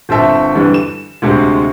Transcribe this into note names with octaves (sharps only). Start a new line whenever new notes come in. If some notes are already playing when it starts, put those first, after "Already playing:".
G1 C4 A4 E5
D3 E3 G3
E7
D2 C3 G#3 C5